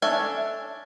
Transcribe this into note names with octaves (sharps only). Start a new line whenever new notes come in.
C#4 D4 A4 E5 G#5